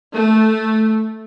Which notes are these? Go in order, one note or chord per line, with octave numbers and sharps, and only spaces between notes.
A3